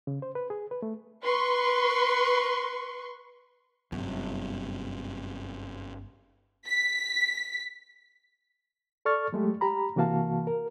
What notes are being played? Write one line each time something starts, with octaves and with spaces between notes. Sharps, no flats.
C#3
C5
B4
G#4
B4
A3
B4 C6 C#6
G1 F#2 C3
B6
A4 D5 C#6 F6 A6
F#3 G#3 A3 G4
G4 A#5 B5
C3 E3 A#3 F#4 F5 A5
A#4